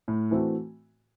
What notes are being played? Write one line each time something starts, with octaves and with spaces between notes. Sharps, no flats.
A2
E3 A3 C4 F#4